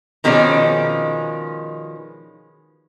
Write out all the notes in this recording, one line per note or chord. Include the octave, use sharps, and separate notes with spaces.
B2 D#3 F3 G#3 C#4 D5